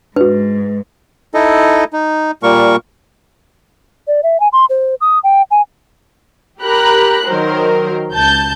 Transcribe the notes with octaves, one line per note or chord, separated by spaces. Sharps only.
G#2 D4 F#4 B4
D#4 E4 A4 D#5
D#4
A#2 G3 A#3 A#4 C#6
D5
E5
G#5
C6
C5
D#6
G5
G#5
G4 A#4 A#5 B5 F#6
D#3 F#3 A#4 C5
C#2 A5 G6